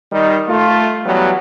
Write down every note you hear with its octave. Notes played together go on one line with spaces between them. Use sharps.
D#3 G3 D#4
A3 F4
E3 F#3 G3 B3